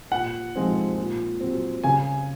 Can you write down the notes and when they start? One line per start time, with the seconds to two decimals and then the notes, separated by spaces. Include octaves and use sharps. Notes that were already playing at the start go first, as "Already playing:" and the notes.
0.11 A#2 F#5
0.55 F3 G#3 C4 D#4
0.97 A#2
1.40 F#3 C4
1.84 C#3 G#5